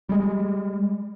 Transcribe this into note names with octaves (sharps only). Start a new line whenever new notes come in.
G3 G#3